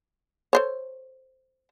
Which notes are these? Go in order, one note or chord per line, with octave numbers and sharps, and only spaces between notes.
A4 C5 C#5